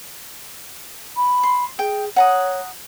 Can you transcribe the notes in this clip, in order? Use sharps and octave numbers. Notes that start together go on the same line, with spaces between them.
B5
C6
G#4 G5
C#5 F#5 A#5 D#6